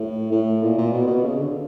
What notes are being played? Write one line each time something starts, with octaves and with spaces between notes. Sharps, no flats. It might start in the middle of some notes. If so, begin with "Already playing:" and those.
Already playing: A2
A2
A#2
A#2
B2
B2
C#3
D3